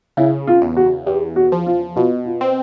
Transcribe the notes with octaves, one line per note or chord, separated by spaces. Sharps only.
C#3 E4
F4
E2
F#4
E2 G4
F#4
F3
F4
B2 F4
F4
C4